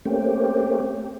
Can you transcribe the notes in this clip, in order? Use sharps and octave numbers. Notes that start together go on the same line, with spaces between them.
A3 A#3 C4 C#4 G4